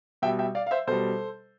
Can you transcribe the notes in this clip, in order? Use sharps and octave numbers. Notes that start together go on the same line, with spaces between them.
B2 G3 E5 G5
E5 G5
D5 F5
F5
C5 E5
B2 G3 A4 C5